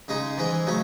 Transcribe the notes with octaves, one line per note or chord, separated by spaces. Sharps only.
C#3 G#3 D#4
G#2 E3 G#3
C#3 F#3 A3